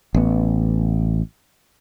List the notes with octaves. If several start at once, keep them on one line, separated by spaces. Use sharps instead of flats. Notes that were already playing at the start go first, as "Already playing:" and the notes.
A1 B3